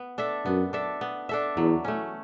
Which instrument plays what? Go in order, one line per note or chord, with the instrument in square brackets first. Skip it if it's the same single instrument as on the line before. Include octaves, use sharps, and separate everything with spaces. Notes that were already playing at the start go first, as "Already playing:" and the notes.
Already playing: [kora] B3
D4 A4 E5
[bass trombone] F#2 [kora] B3
[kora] D4 A4 E5
B3
D4 A4 E5
[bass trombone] E2 [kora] F#3
[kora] A3 C#4